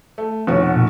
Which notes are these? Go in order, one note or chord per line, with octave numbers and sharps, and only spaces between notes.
A3
F1 B2 F#4 C#5
F#5
A#2